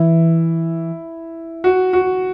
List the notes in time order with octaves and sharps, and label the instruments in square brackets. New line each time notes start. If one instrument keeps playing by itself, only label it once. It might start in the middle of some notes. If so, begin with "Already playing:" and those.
Already playing: [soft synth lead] E3 [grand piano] E4
[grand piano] F#4
F#4